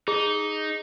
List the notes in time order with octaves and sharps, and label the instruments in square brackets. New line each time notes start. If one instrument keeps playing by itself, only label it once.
[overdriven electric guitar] D#4 [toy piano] G#4